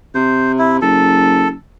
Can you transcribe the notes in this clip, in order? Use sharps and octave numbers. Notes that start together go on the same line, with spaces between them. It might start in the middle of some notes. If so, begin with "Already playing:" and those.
C3 C5
E4
F#1 A4